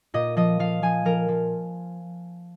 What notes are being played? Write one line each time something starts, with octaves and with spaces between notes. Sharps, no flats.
A#2 D#5
F3 D#5
F3 F5
F3 G#5
F3 A#4
F3